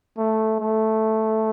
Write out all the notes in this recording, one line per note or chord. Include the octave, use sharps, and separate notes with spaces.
A3
A3